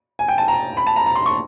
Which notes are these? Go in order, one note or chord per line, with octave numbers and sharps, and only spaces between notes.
G#5
G5
A5
A#5
B5
A5
A#5
A#5
C6
C#6